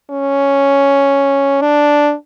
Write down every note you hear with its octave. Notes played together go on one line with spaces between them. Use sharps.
C#4
D4